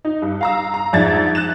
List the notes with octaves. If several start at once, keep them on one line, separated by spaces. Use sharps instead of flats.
D#4
G2
F5 A#5 E6
A#5
F2 G#2 D4 E5 G#6 A6
F#6 A6 E7